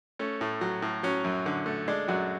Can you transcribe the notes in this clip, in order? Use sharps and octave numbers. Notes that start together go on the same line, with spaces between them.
A3 C#4
A2
F#3
A2
F#3 C#4
F#2
D3
A3
G#3 D4
F#2 F#3 F#4